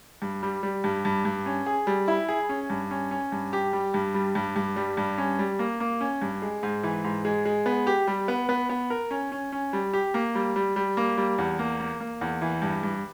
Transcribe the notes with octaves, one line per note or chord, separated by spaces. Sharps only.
G2
G3
G3
G2
G2
G2
C#4
G#4
G3
E4
G#4
C#4
G2
C#4
C#4
G2
G4
G3
G2
G3
G2
G2
G3
G2
C#4
G3
A#3
A#3
C#4
G2
G#3
G#2
E3
G#2
G#3
G#3
B3
G4
G3
B3
B3
B3
A#4
C#4
C#4
C#4
G3
G4
A#3
G3
G3
G3
A#3
G3
E2
A#3
A#3
A#3
E2
E3
G2
G2